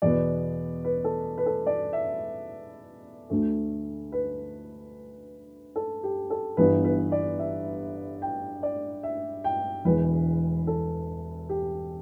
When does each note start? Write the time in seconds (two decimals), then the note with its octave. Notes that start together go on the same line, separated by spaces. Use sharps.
0.02 E2 B2 B3 D5
0.84 B4
1.04 A4
1.38 B4
1.46 A4
1.66 D5
1.93 E5
3.30 D2 D3 A3
4.12 B4
5.76 A4
6.03 G4
6.30 A4
6.57 G1 G2 E3 B3 B4
6.85 B4
7.12 D5
7.39 E5
8.22 G5
8.63 D5
9.03 E5
9.44 G5
9.85 E1 E2 E3 B4
10.67 A4
11.49 G4